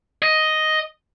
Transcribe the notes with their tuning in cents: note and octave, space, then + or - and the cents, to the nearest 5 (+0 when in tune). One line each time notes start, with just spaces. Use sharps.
D#5 +5